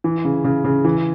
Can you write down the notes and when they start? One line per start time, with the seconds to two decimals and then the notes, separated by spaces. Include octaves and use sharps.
0.04 E3
0.25 C#3
0.44 C#3
0.65 C#3
0.85 E3